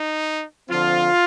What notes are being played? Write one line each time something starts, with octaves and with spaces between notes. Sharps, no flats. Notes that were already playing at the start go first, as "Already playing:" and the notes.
Already playing: D#4
D3 F3 C4 F4